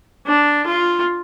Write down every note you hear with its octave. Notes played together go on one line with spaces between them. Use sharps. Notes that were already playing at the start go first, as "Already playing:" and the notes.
D4
F4